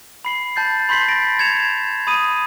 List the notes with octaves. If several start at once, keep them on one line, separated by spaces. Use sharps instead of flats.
B5 C7 F#7
A5 G6 A6 C7
B5 C6 G6 B6 C7 F#7
A6 A#6 D7
G#6 C#7 E7 F7
B5 D#6 D#7